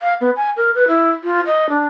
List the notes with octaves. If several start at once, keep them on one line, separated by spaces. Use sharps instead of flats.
F5
B3
G#5
A#4
B4
E4
F4
D#5
D4